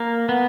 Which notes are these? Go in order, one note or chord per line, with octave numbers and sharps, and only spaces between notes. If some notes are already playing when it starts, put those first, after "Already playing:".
Already playing: A#3
B3